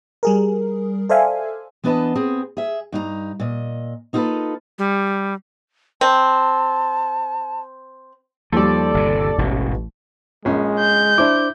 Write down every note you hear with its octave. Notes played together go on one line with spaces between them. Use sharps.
G3 G#4 A#4
A4 C5 D5 E5 F5 G#5
E3 B3 D4 B4 D#5 A5
B3 C4 G#4
G#4 E5
G2 D#4 A#4 A#5
A#2 D#5
A#3 D#4 F4 F#4 A4 B4
G3
C4 A5
D#2 F3 G3 A4 D5
G1 C3
E1 A1 G#2 B2
A#1 G#3 C#4
G6
D4 E4 C5 D6